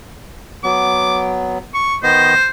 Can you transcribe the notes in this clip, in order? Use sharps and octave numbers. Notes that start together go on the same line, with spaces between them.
F#3 B3 D6
C#6
D#3 B3 C5 D#5